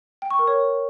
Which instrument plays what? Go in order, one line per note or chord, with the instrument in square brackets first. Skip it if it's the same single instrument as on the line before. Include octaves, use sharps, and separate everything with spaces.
[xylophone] G5
C#6
A#4
C#5